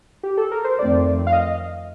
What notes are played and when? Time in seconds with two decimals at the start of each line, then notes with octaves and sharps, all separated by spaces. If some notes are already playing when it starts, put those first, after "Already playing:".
0.23 G4
0.37 A4
0.51 A#4
0.64 C5
0.79 F2 D#3 A3 C4 D5
1.27 F5
1.32 D#5